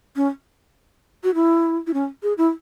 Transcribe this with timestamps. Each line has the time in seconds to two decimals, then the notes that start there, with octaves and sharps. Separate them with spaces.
0.16 C#4
1.24 F#4
1.35 E4
1.87 E4
1.94 C#4
2.23 G#4
2.38 E4